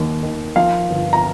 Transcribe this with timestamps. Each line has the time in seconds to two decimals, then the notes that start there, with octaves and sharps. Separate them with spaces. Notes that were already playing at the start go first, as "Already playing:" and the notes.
Already playing: D#2 D#3
0.23 D#3
0.56 F3 F5
0.89 G1
1.13 A#5